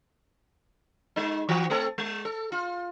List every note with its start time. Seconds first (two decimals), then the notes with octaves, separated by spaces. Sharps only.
1.16 G#3 D#4
1.49 E3 F#4
1.70 A3 C4 A4
1.98 G#3
2.25 A4
2.52 F4